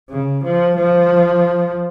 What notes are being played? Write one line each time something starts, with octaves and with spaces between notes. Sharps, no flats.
C#3
F3
F3